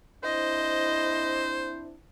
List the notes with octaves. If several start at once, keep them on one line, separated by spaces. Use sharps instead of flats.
C4 D4 E4 C5 D#5